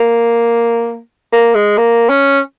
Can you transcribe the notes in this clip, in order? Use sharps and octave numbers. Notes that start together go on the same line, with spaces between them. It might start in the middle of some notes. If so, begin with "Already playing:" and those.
Already playing: A#3
A#3
G#3
A#3
C#4